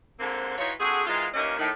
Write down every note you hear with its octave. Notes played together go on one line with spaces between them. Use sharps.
G#2 D3 A#3 C4
E3 D#4 F4 F#4 C#5
D3 C4 F#4 G#4
G#2 D#3 E3 G#3 F4
D#2 A#2 E3 A#3 C#4 D#5
A2 D#3